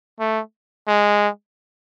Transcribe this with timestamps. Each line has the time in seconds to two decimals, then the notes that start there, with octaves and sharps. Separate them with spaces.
0.20 A3
0.88 G#3